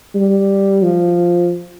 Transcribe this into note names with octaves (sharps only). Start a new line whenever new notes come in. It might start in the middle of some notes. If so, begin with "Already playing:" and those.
G3
F3